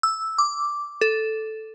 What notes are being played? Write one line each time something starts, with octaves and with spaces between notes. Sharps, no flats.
E6
D6
A4